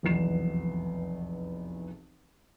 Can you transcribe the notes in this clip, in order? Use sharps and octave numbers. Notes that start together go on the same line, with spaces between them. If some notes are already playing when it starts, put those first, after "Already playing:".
F1 B1 E2 B3 C7 E7